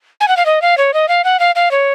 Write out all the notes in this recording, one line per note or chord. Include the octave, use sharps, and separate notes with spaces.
G#5
F#5
F5
D#5
F5
C#5
D#5
F5
F#5
F5
F5
C#5